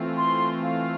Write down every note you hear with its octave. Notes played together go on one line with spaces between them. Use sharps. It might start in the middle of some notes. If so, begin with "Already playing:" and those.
Already playing: E3 A3 C4 F4
C6
F5